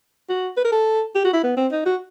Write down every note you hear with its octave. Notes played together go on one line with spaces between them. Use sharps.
F#4
B4
A#4
A4
G4
F#4
E4
B3
C4
D#4
F#4